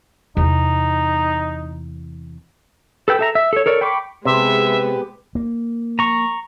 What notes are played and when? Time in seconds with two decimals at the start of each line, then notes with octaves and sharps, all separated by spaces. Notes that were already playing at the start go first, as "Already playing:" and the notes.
0.37 E2 C3 D#4
3.08 A4 B4 G5 E6
3.19 A4 E5 A#5
3.35 E5
3.53 A4 C#5
3.66 A4 A#4 C#5 D5
3.81 G5 B5 C#6 D6
4.25 C3 G#3 B3 G4 B4 E5
5.35 A#3
5.99 A#5 C#6